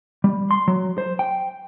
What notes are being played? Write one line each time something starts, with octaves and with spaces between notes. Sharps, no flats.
G3
C6
F#3
C5
G5